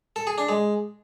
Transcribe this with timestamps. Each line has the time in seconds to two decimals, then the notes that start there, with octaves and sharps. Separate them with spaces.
0.16 A4
0.27 G#4
0.38 D4
0.49 G#3